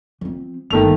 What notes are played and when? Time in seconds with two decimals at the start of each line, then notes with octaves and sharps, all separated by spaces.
0.21 F3 C4
0.71 G1 D#3 A3 F7